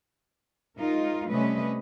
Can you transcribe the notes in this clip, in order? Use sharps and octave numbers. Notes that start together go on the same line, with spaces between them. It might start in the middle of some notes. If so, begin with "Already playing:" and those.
G#3 D#4 F4 A#4
C3 G3 A3 C#4 B4 D#5